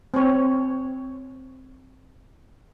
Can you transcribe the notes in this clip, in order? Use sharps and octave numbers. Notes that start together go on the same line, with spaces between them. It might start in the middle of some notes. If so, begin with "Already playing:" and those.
C4 C#5